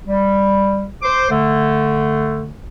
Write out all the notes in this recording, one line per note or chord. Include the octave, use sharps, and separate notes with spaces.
G3
C5 D6
D3 A3